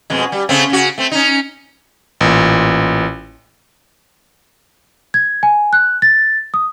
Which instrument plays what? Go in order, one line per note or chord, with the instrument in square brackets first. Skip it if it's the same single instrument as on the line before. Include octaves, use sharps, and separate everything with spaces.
[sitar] F2 B2 G#3
G3
C#3 A3 C4
C#3 F#4
A3 C4
C#4 D#4
[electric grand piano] A1 A#2
[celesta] G#6
G#5
F#6
A6
D#6